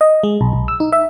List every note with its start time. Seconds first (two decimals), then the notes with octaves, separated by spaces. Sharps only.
0.01 D#5
0.23 G#3
0.41 B1
0.53 B1
0.68 E6
0.80 D#4
0.92 E5